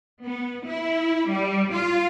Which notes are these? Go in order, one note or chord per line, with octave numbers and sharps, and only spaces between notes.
B3
E4
G3
F4